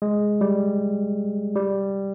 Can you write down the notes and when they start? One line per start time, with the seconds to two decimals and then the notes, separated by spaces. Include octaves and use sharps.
0.02 G#3
0.41 G3
1.56 G3